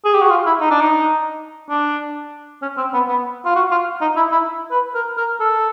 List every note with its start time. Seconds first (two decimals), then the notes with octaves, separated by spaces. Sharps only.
0.05 G#4
0.14 G4
0.22 F#4
0.30 F4
0.46 E4
0.61 D#4
0.71 D4
0.81 D#4
1.69 D4
2.62 C#4
2.77 C4
2.94 B3
3.08 B3
3.45 F4
3.56 F#4
3.71 F4
4.01 D#4
4.16 E4
4.32 E4
4.71 B4
4.94 A#4
5.17 A#4
5.40 A4